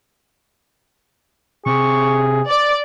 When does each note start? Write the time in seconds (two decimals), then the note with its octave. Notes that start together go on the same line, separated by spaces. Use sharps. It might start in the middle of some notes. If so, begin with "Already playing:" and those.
1.66 C3 G#4 C#6
2.49 D5 D6